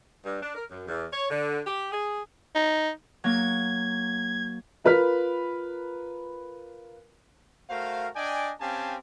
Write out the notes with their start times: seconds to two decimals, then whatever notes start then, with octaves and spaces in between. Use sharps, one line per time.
0.25 G2
0.43 D4
0.55 A#4
0.69 F#2
0.87 E2
1.12 C#5
1.30 D3
1.67 G4
1.92 G#4
2.55 D#4
3.24 F#3 A#3 G#6
4.84 F4 A#4 B4 B5 F6 B6
7.69 A3 F#4 A#4 C5 F5
8.16 D4 D5 D#5 G5 G#5
8.60 C4 C#4 G4 F5 G#5 A5